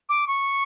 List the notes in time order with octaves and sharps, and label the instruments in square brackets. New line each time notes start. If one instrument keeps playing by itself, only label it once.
[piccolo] D6
C#6